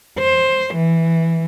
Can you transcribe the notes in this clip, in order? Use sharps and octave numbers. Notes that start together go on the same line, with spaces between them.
C5
E3